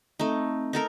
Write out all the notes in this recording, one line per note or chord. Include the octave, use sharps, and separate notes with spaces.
A3 C4 D#4
D#4 A4 A#4